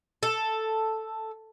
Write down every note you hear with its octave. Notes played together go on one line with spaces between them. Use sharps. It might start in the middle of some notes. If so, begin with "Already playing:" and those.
A4